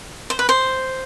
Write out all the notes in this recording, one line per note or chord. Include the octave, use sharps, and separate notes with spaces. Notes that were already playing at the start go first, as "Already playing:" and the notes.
C5
B4
C5